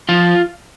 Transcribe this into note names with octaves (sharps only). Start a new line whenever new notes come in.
F3 F4